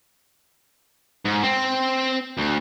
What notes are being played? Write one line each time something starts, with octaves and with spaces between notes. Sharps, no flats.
G#2
C4
D2